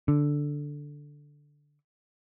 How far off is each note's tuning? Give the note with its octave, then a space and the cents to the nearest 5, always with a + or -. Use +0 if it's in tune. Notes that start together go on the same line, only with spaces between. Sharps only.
D3 -5